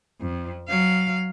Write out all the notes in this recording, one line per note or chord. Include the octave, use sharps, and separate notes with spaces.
F2
F#3 F5